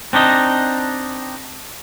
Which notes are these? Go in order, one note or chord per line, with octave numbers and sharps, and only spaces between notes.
C4 D4 D#4 D#5